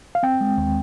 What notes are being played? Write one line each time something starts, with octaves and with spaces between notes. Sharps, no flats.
F5
C4 G5
G#3
D#2